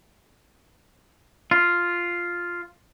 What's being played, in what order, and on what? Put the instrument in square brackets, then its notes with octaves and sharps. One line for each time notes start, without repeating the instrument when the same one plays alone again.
[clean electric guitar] F4